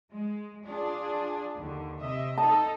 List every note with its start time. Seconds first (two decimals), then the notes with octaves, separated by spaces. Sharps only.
0.10 G#3
0.63 D4 F4 G#4
1.56 D#2 D3
2.00 C3 D#5 E5
2.38 D#4 A4 D#5 A5